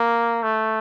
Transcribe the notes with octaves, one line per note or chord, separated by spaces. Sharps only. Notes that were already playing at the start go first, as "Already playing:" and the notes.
Already playing: A#3
A3